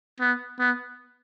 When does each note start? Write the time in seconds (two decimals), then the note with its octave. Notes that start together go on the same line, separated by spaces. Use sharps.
0.20 B3
0.59 B3